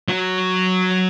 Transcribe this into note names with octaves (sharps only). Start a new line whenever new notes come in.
F#3